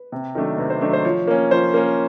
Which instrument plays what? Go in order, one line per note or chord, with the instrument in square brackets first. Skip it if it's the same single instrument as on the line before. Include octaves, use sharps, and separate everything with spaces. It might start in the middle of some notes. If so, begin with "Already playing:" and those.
Already playing: [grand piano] B4
C3
D#3 F#3 A3 D4
C3 B4
C5
D#3 F#3 A3 D4
C5
F3 C#5
A#3 C#4
F3 C5
A#3 C#4